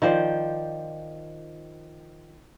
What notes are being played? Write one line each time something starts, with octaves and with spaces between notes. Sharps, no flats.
D#3 F3 C5 D5